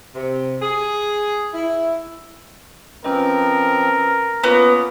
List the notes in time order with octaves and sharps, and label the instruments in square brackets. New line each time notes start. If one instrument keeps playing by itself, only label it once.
[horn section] C3
G#4
E4
[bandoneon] F3 C4 [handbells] C#4 B4 D#5 [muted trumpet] A#4
[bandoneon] A#3 C#4 [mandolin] B3 [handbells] F4 D#6